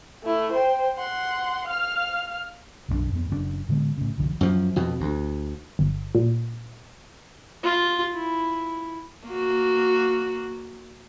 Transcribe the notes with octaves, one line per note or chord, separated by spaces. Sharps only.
A3 E4
C5 G5
F#5 C6
F5 F6
B1 F#2 C4 D4
F2 B3
F#1 C#3 C4 D4
A2 D3 G#3 B3
A2 C#3
F#1 C2 D3 F3
F#2 F3
F2 B2
D2
G1
A#2
F4
E4
A#3 F#4